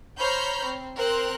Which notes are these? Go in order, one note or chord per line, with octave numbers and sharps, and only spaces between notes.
C5 C#5 A#5 B5 F6 G6
C4
C4 A#4 C5 F#6